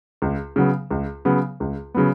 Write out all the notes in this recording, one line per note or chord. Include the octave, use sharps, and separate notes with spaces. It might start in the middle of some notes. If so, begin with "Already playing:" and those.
C#2
C#3 F#3 B3
C#2
C#3 F#3 B3
C#2
C#3 F#3 B3